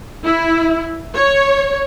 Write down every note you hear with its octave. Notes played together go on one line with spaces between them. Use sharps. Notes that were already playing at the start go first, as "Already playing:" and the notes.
E4
C#5